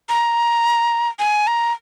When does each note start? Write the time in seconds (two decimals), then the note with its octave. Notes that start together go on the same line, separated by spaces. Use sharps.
0.09 A#5
1.19 G#5
1.47 A#5